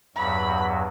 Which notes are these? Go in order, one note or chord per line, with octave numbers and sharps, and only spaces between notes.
E2 G2 F#3 B5